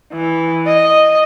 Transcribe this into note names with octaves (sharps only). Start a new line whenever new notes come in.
E3
D#5